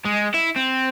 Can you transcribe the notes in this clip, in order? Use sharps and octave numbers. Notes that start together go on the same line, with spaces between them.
G#3
E4
C4